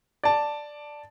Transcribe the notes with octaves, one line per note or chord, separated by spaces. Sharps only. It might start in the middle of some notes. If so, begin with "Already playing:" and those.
D5 A5